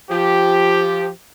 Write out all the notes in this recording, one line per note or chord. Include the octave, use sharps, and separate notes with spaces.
F3 G4